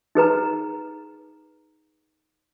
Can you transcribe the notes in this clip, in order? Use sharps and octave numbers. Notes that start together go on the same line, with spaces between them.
D#4 G#4 B4 A#5